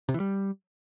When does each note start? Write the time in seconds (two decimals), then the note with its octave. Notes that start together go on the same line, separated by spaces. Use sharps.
0.09 C3
0.14 E3
0.20 G3